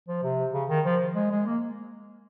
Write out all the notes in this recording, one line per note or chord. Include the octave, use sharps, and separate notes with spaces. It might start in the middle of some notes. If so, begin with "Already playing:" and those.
F3
C3
C#3
D#3
F3
G#3
G#3
A#3